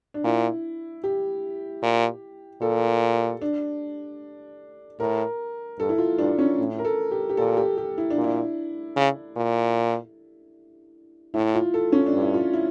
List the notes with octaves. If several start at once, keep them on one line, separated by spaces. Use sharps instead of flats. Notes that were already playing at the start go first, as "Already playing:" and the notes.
D4
A#2 E4
G4
A#2
A#2 A4
D4
A2 A#4
G2 A4
E4
F4
G2 D4
C#4
A2
A#4
A4
G4
G4
A#2 A4
G4
G4
E4
D4
A#2
E4
C#3
A#2
A2 E4
F4
A4
C#4
D4
G2
E4
F4
E4